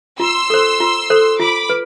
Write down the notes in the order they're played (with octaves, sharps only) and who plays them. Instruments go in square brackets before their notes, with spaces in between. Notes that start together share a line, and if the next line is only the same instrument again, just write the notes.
[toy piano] F4 [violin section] C6 E6
[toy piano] A4 C5
F4
A4 C5
[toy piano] F4 [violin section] B5 D6
[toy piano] B4